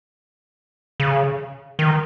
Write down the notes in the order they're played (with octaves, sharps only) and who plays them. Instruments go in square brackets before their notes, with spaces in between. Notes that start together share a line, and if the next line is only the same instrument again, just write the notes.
[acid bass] C#3
D#3